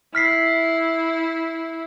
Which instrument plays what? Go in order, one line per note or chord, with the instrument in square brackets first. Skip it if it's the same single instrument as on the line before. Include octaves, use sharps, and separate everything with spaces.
[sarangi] E4 [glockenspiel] F6 B6 C7